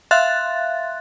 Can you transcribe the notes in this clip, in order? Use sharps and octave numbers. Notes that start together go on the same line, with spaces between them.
E5 F5 C6 F#6 A6